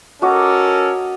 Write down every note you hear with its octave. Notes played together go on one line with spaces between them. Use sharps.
C#4 F#4 A4 A#4 D#5 D6